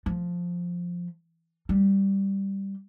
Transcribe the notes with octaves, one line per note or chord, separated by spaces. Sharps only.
F3
G3